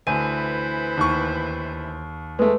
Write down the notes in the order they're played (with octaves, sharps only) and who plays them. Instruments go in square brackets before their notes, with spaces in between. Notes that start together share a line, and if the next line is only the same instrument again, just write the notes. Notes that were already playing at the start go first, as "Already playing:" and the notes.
[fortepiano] D2 [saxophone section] E3 B4 C5 [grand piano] G#5 [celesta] D#7
[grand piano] D#2 C#6
[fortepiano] G#3 A3 [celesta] B4